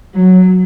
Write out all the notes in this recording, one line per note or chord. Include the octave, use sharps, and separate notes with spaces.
F#3